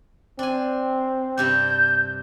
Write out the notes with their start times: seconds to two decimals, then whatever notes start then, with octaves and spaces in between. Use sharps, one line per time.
0.39 C4 D4 G#5
1.38 G2 C3 D4 G6